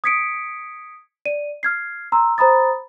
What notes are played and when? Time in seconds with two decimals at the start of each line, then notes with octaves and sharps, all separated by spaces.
0.04 D#6 G#6 B6 C#7 D7
1.26 D5 D#7
1.63 F6 G#6 C7
2.12 A#5 C6 E6
2.38 C5 A#5 B5 D#6 A6